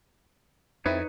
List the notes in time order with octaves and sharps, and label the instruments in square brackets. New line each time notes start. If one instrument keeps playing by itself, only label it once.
[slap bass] F2 [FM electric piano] C4 E4 [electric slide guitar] D#4 B4 C#5